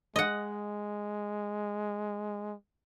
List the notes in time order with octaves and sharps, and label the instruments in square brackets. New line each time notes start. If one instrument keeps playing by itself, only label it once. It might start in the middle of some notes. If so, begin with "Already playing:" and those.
[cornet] G#3 [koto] D#5 F#5